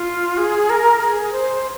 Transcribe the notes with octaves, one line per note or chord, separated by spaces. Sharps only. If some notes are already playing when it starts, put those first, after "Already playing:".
Already playing: F4
G#4
A#4
G#4
C5